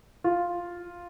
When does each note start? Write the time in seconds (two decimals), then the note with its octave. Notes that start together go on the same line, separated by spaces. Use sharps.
0.24 F4